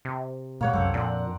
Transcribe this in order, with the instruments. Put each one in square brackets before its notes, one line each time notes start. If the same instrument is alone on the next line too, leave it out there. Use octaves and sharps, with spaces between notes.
[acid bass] C3
[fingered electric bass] A#2 G#3 [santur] A#3 C#5 F#5
[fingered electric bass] C2 F#2 [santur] C4 A4 G5
[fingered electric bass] F2 [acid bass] A#2 [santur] D4 A#4 F#5